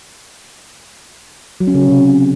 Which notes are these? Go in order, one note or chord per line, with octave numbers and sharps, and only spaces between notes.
F#3
C#4
C#3
F#3
C3